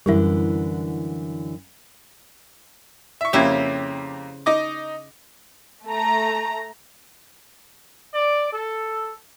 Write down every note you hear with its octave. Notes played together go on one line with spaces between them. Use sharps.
F#2 D3 E3 G3 E4
E5 C#6
F2 C#3 A#3 E4 G4
D#4 D#5 D6
A3 A#5
D5
A4